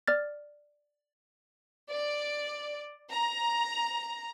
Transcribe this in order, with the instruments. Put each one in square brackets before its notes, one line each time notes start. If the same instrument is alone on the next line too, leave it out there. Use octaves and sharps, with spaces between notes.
[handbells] D5 F6 A6
[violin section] D5
A#5